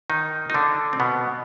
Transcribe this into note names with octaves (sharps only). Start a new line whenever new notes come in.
D#3 D#4
D#4
D3 D4
C4
B2 B3